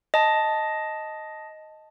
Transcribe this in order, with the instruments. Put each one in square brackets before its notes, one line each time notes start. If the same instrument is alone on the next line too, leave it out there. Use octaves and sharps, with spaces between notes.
[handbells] D#5 A5